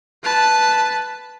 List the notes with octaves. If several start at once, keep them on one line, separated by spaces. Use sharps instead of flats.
B4 A5